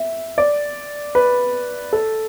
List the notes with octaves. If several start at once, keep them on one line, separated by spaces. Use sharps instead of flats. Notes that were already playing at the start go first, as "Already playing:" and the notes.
Already playing: E5
D5
B4
A4